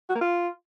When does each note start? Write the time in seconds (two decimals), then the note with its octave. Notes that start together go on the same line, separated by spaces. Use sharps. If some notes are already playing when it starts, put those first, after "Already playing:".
0.09 F#4
0.15 A#3
0.21 F4